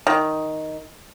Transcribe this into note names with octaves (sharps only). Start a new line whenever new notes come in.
D#3